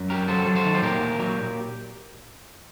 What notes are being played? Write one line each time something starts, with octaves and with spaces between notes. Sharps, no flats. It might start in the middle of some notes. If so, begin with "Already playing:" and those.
Already playing: F#2
F#3 G4 A#4
F#3 A4 C5
F#3
A4 C5
D#3
C5
A#2 G4 A#4
A#2
F#3